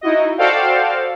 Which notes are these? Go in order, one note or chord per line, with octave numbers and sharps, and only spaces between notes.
D#4 E4 F#4 D#5
F#4 A4 C5 D5 F5 G5